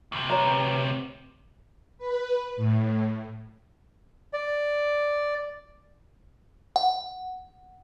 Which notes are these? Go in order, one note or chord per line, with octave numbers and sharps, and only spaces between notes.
D2 C3
B4 C#5 A#5
B4
A2
D5
F#5